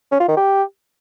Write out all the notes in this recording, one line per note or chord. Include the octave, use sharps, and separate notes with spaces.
C#4
F4
D#3
G4